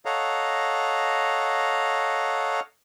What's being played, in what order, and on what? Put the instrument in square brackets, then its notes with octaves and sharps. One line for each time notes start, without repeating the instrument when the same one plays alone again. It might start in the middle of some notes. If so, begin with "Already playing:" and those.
[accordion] A4 C#5 D#5 F5 F#5 A#5